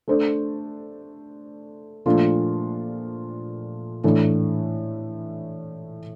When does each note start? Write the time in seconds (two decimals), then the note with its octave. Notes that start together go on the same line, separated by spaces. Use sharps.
0.08 A3 D4 A4 C5
2.06 A#2 F3 A3 D4 F4
4.04 A2 E3 A3 D4